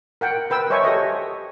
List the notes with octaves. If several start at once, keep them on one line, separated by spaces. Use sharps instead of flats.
A#4 F#5 G5
A#4 B4 G5 E6
C5 C#5 D#5 E5 G#5 C#6
G4 A4 C#5 D#5